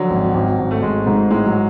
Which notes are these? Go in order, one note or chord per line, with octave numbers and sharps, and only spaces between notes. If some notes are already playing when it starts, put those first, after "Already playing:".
Already playing: D3 F3 F#3
G#1
G#1
G#1
A3
G#1 G#3
G#2
A2 G#3
F#3